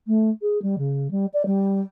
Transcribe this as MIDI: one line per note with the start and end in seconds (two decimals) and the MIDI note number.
0.07 0.29 57
0.41 0.61 68
0.62 0.75 55
0.78 1.10 49
1.10 1.25 55
1.33 1.42 74
1.45 1.80 55